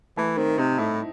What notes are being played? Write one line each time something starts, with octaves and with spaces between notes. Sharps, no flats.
E3 A3
D#3 C4
C3 D#4
A2 E4